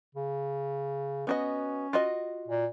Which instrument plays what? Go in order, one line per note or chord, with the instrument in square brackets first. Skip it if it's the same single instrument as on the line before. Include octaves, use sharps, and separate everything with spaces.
[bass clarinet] C#3
[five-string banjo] B3 F#4 D#5 [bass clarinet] C#4
[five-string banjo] F4 F#4 D#5
[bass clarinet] A#2